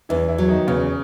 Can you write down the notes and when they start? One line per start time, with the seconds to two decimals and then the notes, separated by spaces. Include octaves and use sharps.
0.09 E2 E3 E4
0.28 E3 E4
0.38 F#3
0.48 D#3 D#4
0.68 E2 C#3 C#4